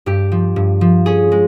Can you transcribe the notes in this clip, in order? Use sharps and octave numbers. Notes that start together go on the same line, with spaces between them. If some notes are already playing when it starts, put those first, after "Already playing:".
G2 G4
F3
G2
F3
C#4 G#4
G#3